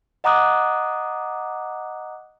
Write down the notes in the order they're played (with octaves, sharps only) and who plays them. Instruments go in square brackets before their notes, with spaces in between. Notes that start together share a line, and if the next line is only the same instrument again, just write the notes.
[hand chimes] D#5 F#5 A#5 D6 D#6 F#6